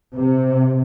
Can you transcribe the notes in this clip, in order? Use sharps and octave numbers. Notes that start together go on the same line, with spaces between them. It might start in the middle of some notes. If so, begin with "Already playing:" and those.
C3